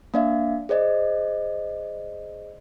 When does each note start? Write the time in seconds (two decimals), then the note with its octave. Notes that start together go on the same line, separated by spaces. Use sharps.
0.14 A#3 D4 D5 E5 F5
0.69 G#4 C5 D5 D#5